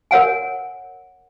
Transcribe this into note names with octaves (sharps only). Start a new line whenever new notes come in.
A#4 C#5 F#5 G#5